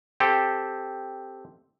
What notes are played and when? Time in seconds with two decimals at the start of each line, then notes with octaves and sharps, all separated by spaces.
0.20 C4 G4 A4